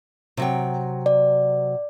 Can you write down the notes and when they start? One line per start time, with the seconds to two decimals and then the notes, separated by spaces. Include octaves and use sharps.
0.37 C3 F#3 G5
1.06 D5